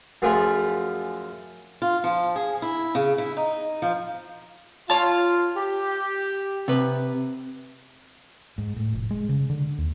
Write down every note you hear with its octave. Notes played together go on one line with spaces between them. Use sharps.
F#2 F3 A3 F4 G#4 B5
F4
F3
G#4
E4
C#3
E4
D#4
F3
F4 C#5 A5
G4
C3 B4
G#2
A2
F1
G#3
C#3
D3
D#2